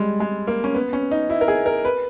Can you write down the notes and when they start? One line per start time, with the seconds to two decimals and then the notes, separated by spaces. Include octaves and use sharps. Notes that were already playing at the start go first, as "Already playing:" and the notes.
Already playing: G3 G#3
0.20 G#3
0.47 A#3
0.64 C#4
0.75 B3
0.93 C#4
1.11 D#4
1.30 E4
1.41 A#4
1.48 G#4
1.66 A#4
1.85 B4